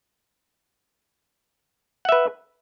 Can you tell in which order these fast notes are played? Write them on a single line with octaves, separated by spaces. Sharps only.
F#5 E5 B4